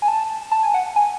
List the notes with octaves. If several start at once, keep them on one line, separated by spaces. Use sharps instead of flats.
G#5
A5
A5
G#5
F#5
G#5